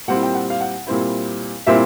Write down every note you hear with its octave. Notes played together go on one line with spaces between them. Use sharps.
A#2 G3 C4 E4 F#5
G5
F#5
F5
F#5
A#2 G3 C4 E4
A#2 G3 C4 E4 E5